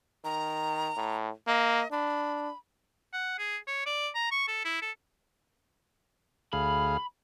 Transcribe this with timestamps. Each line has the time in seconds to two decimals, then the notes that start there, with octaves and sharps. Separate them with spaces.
0.25 D#3 A#5
0.97 A2
1.47 A#3 D#5
1.92 D4 B5
3.13 F#5
3.38 G#4
3.67 C#5
3.86 D5
4.15 A#5
4.31 C#6
4.48 A4
4.65 E4
4.82 A4
6.53 D2 G#4 F5 B5